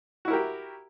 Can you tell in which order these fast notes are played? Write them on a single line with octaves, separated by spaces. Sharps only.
F#4 E4 A#4 G4